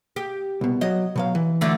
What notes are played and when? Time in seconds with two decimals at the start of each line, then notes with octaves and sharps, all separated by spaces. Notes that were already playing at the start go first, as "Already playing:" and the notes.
0.16 G4
0.61 C2 B2
0.81 F#3 D#5
1.16 B2 F#3 F5
1.35 E3
1.61 D3 F#3 A3